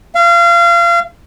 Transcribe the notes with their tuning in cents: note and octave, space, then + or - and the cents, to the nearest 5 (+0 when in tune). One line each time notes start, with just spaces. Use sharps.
F5 -30